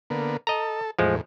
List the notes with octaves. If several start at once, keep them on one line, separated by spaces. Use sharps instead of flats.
D3 A#3 B3
A4 D#5 A#5
E2 A2 F3 G#3